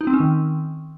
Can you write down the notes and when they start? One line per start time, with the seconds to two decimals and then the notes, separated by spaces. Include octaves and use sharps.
0.01 D#4
0.07 C4
0.14 C#4
0.20 D#3